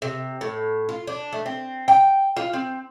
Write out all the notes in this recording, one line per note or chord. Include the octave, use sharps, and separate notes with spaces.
C3
A2
F4
D4
A3
C4
G5
F4
C4